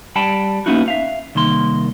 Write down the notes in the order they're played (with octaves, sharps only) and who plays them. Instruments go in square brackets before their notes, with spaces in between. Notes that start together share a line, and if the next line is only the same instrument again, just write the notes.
[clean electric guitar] G3 G5 A5 B5
A#3 B3 C#4 D#4 E4 F#4
E5 F5
C2 D#3 A#3 C6